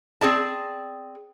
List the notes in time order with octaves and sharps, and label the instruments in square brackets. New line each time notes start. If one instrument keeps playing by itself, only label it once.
[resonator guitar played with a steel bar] C4 G#4 D5 A5